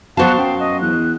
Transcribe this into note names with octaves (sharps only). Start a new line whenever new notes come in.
B2 F#3 B3 F#4 C5 F5 F#5 A5
F#2 G5
D#5
E2 F#6